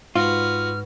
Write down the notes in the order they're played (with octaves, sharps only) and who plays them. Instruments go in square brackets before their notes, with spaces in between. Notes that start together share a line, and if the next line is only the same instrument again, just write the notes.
[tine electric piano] G#2 [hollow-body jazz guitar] F4 [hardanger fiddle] F#4 B4 [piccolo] F6